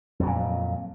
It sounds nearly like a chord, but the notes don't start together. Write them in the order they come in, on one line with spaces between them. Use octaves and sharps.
F2 F#3 A#2